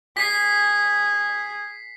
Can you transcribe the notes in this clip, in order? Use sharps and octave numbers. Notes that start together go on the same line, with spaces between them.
G#4 B6 C7